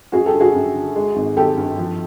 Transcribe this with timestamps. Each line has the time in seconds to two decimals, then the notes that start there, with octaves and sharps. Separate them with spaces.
0.12 F#2 F#4 G#4
0.26 G4 A4
0.33 D3
0.40 F#4 G#4
0.54 F#2
0.75 D3
0.96 G#3
1.16 G#1
1.37 G#1 G4 A4
1.58 G2
1.78 F3